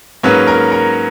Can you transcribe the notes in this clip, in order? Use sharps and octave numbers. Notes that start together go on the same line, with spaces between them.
G#2 F#3 A#3 C#4 B4
A#4
A#4